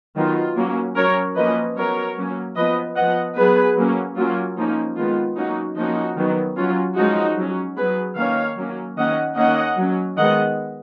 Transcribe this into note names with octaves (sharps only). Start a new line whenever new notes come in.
D#3 F#3 B3 F4
F#3 A#3 C#4
F#3 C#4 A#4 C#5
F3 A#3 C#4 B4 D#5
F#3 B3 A#4 C#5
F#3 A#3 C#4
F3 B3 B4 D#5
F3 B3 D#5 F#5
F#3 B3 G#4 B4
F#3 A#3 C#4
F#3 A#3 C#4 F4
F3 A#3 C#4 D#4
D#3 G#3 B3 F4
F#3 A#3 C#4 D#4 F#4
F3 A#3 C#4 D#4 F#4
D#3 F#3 B3
F#3 C#4 F4
F3 G#3 C#4 D#4 F#4
F#3 C#4
F#3 B3 G#4 B4
D#3 A#3 C#4 C#5 F5
F#3 A#3 C#4
D#3 A#3 C#4 D#5 F#5
D#3 A#3 C#4 D#5 F#5
F#3 C#4
D#3 G#3 B3 D#5 F#5